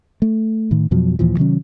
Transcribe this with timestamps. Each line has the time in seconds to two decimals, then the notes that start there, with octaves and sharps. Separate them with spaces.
0.22 A3
0.71 A2 D#3
0.91 F2 B2 F3 F#3
1.19 D#2 A#2 E3 F3
1.37 C3 D#3 F#3 C#4